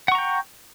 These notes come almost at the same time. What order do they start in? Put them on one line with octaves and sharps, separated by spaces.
F#5 C#6 A#5 G5